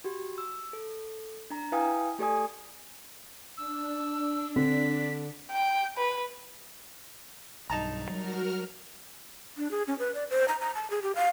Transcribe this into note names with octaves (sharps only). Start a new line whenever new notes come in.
F#4 G4
E6
A4
D4 A#5
E4 B4 F5 G5 G#5 D#6
A3 G4 A4 D5 G#5 D#6
D4 E6
D3 C4 B6
G5
B4
B1 G2 D#4 A5 A#5
F#3 G3 F#4 A#4 F6
D4
G#4
C#4
B4
D5
C5
A#5
A#5
A5
G#4
G4
F5